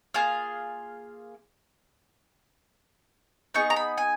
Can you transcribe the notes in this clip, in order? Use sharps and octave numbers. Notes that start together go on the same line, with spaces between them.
A#3 F4 G#4 F5
B3 D#4 G#4 C#6
A#5
B5
G#5